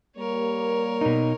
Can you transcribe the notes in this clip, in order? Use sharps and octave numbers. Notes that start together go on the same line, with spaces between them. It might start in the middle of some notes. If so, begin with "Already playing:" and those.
G3 A#3 A#4 C#5
B2 D#4